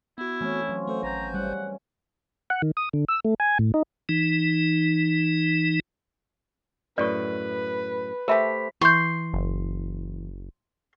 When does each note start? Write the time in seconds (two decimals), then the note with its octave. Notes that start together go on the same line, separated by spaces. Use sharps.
0.18 B3 E4 F#4
0.41 E3 A3 C4 C#4
0.69 B2 F3 F#3
0.87 A3 A4 C5
1.03 G#1 C5 A#5 G6
1.34 G2 C#3 G3 F#5
2.50 F#5
2.62 D#3
2.77 D#6
2.93 D3
3.08 E6
3.25 A3
3.40 G#5
3.59 A2
3.74 D#4
4.09 E3 D#4
6.98 F#2 A2 B4 D5 C#6
8.28 A3 G4 A#4 C5 E5 A5 B5 B6
8.81 E3 C6 C#6 G6
9.33 F#1